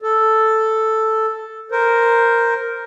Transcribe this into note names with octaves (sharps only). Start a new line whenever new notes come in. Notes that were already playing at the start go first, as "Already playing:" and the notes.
A4
A#4 C5